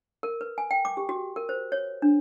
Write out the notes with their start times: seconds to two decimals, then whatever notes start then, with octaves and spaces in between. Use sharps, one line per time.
0.23 A#4
0.41 B4
0.58 G#5
0.71 G5
0.85 D6
0.97 G4
1.09 F#4
1.36 A#4
1.49 C5
1.72 C#5
2.02 D4